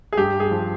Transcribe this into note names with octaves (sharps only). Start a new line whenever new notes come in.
G#4
G2 G4
G#4
F3